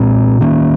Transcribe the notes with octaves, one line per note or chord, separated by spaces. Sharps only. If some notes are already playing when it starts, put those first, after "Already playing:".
Already playing: A#2 G#3 C4
D#3 A#3 C#4